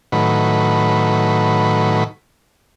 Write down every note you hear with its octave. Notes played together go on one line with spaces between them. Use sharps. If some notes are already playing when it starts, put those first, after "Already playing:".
A2 D#3 F#3 B4